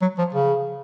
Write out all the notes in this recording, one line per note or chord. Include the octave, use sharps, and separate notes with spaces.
F#3
F3
C#3